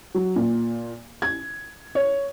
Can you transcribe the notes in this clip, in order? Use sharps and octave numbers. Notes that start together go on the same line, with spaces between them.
F#3
A#2
G#6
C#5